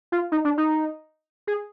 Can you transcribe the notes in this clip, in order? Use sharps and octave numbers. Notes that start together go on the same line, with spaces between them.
F4
D#4
D4
D#4
G#4